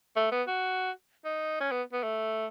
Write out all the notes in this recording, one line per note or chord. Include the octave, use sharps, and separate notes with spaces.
A3
B3
F#4
D#4
C#4
B3
B3
A3